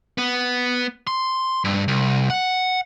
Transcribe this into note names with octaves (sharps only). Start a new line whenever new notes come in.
B3
C6
G2
C2
F#5